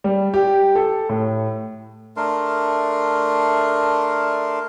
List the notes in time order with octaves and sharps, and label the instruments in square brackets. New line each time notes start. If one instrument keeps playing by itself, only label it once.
[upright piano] G3
G4
A4
A2
[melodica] A3 D4 A#4 C6